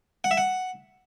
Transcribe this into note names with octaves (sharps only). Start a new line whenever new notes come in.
F#5
E5
F#5